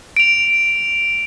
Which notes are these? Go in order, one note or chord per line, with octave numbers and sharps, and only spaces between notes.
D7 F7